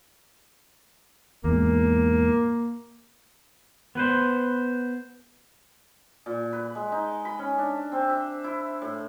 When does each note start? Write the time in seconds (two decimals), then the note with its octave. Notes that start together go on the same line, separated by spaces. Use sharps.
1.44 E2 G#2 A#3
3.95 B3 B4 C5
6.26 A#2
6.53 B4
6.75 G#3
6.92 D#4
7.25 B5
7.39 C#4
7.58 D4
7.92 C4
8.10 E5
8.44 E4
8.82 A2